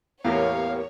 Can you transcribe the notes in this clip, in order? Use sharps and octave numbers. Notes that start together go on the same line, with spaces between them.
E2 A2 A#3 B3 G4 A#4 C#5 F5